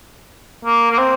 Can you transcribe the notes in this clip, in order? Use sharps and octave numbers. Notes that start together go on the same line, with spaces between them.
A#3
A#3
C4